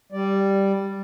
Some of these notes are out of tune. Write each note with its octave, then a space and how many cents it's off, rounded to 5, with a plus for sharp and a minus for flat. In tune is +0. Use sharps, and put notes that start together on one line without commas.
G3 +0 D5 +0